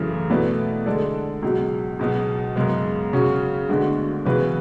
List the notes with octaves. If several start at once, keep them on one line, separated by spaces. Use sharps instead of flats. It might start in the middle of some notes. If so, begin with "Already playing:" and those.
Already playing: F#2 C#3 E3 A3
B2 A3 E4 B4 D5
D3 G#3 D4 A4 D5
C#2 B2 F#3
C#2 B2 F#3 B3
F#2 C#3 G#3 B3
C#3 F#3 C#4 F#4
D2 D3 G#3 B3 F#4
C#3 E3 B3 F#4 B4